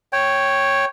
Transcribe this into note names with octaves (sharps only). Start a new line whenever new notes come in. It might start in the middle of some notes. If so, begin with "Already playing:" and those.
C#5 G5